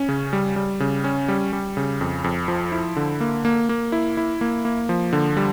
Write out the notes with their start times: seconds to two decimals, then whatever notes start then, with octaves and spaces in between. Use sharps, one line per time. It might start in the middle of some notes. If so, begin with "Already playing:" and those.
Already playing: C#4
0.09 C#3
0.33 G3
0.56 G3
0.80 C#3
1.04 C#4
1.28 G3
1.53 G3
1.77 C#3
2.01 F2
2.24 F2
2.48 F3
2.72 E4
2.96 D3
3.21 A#3
3.45 A#3
3.69 A#3
3.92 E4
4.17 E4
4.41 A#3
4.65 A#3
4.89 F3
5.13 D3
5.37 G3